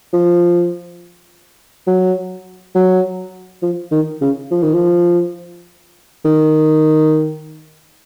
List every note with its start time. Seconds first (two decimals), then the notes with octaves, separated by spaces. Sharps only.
0.13 F3
1.87 F#3
2.75 F#3
3.62 F3
3.92 D#3
4.21 C#3
4.51 F3
4.63 D#3
4.74 F3
6.25 D#3